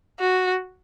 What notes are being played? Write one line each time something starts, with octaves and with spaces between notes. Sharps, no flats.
F#4